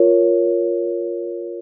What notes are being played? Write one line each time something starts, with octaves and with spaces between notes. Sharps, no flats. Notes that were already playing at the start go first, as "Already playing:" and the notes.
Already playing: F4 A#4 C#5